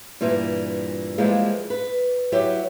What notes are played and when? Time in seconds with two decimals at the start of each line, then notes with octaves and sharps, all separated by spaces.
0.21 G2 A#2 E3
1.18 E3 F3 G3 G#3 A#3
1.70 B4
2.32 F#3 E4 G4